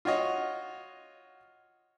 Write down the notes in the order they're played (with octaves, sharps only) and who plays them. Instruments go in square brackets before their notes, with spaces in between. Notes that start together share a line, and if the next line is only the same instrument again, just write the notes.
[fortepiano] F4 F#4 C#5 D#5